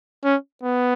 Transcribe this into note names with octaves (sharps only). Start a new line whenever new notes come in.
C#4
B3